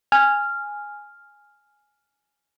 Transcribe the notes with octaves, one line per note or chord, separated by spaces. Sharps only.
G#5 F6